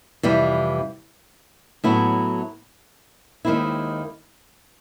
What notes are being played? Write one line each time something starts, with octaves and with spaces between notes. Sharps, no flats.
F2 C3 E3 G3
A2 F#3 B3 E4
D#2 D#3 G#3 C4 E4